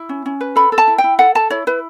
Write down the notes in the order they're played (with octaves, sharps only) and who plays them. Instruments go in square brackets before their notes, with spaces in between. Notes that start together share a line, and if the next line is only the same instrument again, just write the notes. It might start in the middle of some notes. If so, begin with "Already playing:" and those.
Already playing: [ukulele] E4
C#4
C#4
B4
A4 B5
A4
A5
E4
G5
E4
A4 F#5
A4 A5
E4 C#5
E4 B4